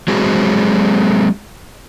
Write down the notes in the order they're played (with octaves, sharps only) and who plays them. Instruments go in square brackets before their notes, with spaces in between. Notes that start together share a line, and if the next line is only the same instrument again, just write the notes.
[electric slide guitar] F#3 G#3 C4 F#4 G#4